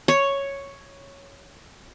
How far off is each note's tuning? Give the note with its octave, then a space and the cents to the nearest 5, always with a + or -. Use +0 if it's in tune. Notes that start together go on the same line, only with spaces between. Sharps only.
C#5 +0 C#6 +0